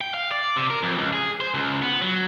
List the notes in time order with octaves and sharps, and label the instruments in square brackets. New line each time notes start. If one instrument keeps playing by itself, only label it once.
[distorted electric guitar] G5
F5
D5
C3
A#4
F2
C#2
G#4
C5
C#2
B3
F#3